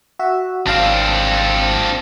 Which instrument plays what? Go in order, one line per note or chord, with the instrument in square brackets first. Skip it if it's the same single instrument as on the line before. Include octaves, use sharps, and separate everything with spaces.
[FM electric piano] F#4 E5
[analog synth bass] G#1 [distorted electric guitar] C4 D4 [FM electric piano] F5 A5